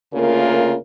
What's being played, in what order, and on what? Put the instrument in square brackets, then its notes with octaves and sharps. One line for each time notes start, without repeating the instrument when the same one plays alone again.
[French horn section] D2 C#3 A#3 F4 A#4